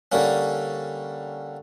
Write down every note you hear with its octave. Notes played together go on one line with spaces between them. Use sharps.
D3 G3 A#3 C#4